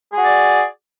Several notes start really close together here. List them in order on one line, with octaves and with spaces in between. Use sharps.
G#4 F#4 D5